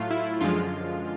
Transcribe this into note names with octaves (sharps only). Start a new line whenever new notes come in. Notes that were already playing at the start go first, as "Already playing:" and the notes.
Already playing: A2 F#3 A3 F4
E4
F#2 D3 F3 G#3 F4